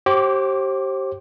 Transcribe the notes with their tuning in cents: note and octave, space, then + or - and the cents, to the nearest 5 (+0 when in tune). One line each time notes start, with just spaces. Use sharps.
G4 -25 C5 +35 D6 +0